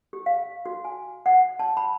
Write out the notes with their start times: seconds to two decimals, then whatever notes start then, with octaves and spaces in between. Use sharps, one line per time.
0.13 G4
0.26 F5
0.66 F#4
0.84 G#5
1.26 F#5
1.59 A5
1.77 B5